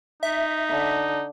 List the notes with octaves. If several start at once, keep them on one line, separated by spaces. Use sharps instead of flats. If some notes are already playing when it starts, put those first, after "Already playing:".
D#4 E5
D3